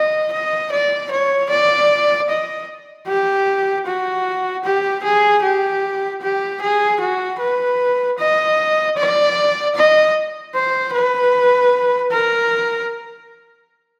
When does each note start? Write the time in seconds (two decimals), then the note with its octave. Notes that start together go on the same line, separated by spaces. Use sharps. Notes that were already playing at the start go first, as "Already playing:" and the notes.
Already playing: D#5
0.33 D#5
0.72 D5
1.12 C#5
1.50 D5
2.30 D#5
3.08 G4
3.87 F#4
4.65 G4
5.04 G#4
5.43 G4
6.22 G4
6.62 G#4
7.00 F#4
7.40 B4
8.19 D#5
8.97 D5
9.76 D#5
10.55 C5
10.94 B4
12.12 A#4